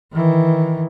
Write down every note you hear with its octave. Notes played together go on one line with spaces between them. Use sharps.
D#3 E3